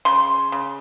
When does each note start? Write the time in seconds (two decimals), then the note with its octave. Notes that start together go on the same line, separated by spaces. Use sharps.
0.05 C#3 C6
0.52 C#3